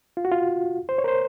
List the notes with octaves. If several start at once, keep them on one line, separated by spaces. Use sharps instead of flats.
F4
F#4
F4
C5
C#5
A#4
C5